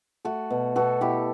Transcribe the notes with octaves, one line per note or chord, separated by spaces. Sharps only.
A3 F#4 A4
B2
B2 F#4 A4
B2 E4 G4